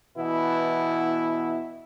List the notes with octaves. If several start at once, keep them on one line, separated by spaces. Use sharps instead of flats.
B2 E3 B3 E4